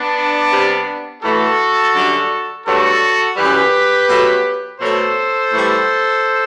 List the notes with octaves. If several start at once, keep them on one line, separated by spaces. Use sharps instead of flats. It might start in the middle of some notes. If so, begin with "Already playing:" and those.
Already playing: B3 D4
C3 G3
A2 E3 A3 F#4 A4
F#2 D3 G3
G2 F#3 A3 F#4 A4
F#2 E3 G3 G4 B4
B2 F#3 A3
B2 F#3 A3 A4 C5
A2 E3 G3